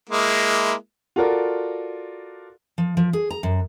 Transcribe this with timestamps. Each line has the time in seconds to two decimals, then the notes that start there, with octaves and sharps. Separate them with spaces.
0.09 G#3 A#3 E4
1.16 F4 F#4 A4 A#4 D5
2.78 F3
2.97 F3
3.13 G#4
3.30 A#5
3.43 F#2